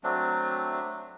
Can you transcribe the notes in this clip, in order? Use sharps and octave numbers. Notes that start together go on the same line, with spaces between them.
F#3 A3 C4 D4